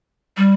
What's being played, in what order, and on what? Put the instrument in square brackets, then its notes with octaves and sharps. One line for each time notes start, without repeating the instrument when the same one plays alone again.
[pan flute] G3